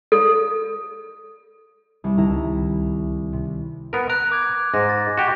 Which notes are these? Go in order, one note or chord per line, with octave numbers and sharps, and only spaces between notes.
A4
C2
C#2 D#3 E4 A5 A#5 E6
C3
B3 A#4
A#5 F#6 D7
D6 G#6
G#2 A#6
A6
F#4 G4 D6 A6